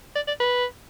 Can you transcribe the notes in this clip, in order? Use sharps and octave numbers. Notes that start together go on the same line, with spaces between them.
D5
D5
B4